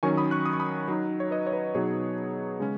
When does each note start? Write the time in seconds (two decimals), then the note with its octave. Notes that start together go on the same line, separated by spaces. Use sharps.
0.03 D#3 F#3 C#4 G#5 C#6
0.17 B5 D#6
0.31 C#6 F#6
0.46 D#6
0.53 C#6
0.60 B5 D#6
0.88 F#3 D#4
1.20 C#5
1.31 B4 D#5
1.47 C#5
1.52 B4 D#5
1.75 B2 F#3 B3 D#4 G#4 C#5
2.60 C#3 G#3 C#4